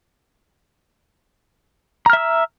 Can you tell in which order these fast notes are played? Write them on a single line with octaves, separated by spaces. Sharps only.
A#5 F6 E5 E6